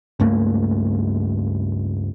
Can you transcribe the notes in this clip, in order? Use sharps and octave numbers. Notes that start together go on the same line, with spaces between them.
C#2 G2 A3 A#3